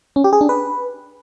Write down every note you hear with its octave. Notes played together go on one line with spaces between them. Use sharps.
C#4
G4
G#4
D4
B4